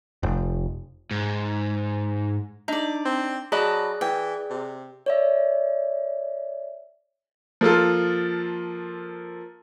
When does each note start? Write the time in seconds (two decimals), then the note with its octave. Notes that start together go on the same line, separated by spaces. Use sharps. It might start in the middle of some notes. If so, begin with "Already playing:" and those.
0.23 F1
1.11 G#2
2.68 D4 D#4 D5
3.05 C4
3.52 F#3 G#4 D5 D#5 A5 B5 F#6
4.01 E3 G5
4.50 C3
5.06 C#5 D5 E5
7.61 F3 A#3 F4 A4